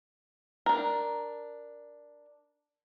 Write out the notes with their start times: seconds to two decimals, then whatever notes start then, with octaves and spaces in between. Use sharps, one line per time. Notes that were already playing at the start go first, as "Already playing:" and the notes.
0.66 D4 A#4